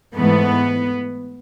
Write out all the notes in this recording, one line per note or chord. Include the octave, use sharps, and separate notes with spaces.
G#2 E3 A3 B3